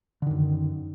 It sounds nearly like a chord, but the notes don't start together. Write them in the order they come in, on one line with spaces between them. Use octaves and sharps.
D3 D#3 F#2